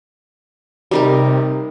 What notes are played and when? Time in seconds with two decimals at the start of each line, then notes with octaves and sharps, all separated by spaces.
0.91 C3 G3 D#4 A#4